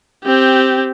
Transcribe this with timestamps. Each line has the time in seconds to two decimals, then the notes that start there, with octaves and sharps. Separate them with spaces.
0.23 C4 G4